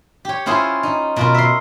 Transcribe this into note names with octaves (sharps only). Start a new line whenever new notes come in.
G4 C#5
C#4 E4 F4 G#4 C5 C#5
D#4
B2 F4 A#4
E5 C6